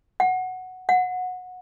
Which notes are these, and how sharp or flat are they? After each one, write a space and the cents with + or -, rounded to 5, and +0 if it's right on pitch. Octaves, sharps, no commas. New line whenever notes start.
F#5 +0
F#5 -20